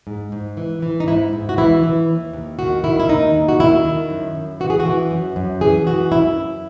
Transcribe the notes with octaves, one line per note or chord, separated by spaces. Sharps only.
G#2
G#2
E3
E3
D#4
G#2 E4
G#2
F#4
E3 E4
E3
D#2
D#2
D#3 F#4
D#3 E4
E4
D#2 D#4
D#2
F#4
D#3 E4
D#3
F#2
F#2
E3 F#4
G#4
F#4
E3
F#2
F#2
E3 G#4
E3 F#4
F#2 E4
F#2